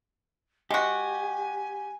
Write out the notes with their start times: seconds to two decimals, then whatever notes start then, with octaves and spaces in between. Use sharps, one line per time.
0.71 G#3 F#4 G4 G#5